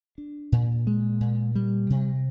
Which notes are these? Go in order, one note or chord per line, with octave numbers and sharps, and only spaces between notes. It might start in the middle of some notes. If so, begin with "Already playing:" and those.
D4
A#2
G#3
A#2
G3
C3